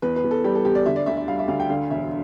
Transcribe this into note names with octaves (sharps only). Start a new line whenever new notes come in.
E2 B4
B4
E2
A4
G3 G4
A4
E2 G4
D5
D3 E5
D5
D2 E5
E5
G3 F5
E5
D2 F5
G5
D3 F5
E1 E5